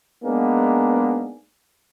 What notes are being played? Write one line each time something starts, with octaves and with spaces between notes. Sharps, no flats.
G#3 A#3 B3 D4 D#4 G#4